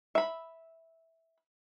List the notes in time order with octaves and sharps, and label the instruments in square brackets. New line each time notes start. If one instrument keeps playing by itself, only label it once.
[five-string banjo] E5 B5